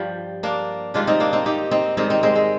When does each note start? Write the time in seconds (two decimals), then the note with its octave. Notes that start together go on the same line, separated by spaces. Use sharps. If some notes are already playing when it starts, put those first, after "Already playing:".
Already playing: G2 F3 G3
0.43 A#3 D4
0.94 G#2 D#3 G3 D4 F4
1.07 C4 D#4
1.20 A#3 D4
1.33 C4 D#4
1.46 D#4 G4
1.71 C4 D#4
1.97 G#2 D#3 G3 C4 D#4
2.10 C4 D#4
2.23 G#3 C4
2.36 G#3